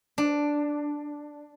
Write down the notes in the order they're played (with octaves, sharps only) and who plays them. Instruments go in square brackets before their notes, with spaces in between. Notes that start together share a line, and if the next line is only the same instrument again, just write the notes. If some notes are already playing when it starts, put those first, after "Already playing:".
[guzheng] D4